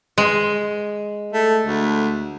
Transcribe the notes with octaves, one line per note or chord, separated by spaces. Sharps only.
G#3
A3
D2